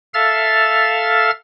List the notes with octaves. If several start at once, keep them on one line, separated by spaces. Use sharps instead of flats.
A4 E5 F5 F6 A6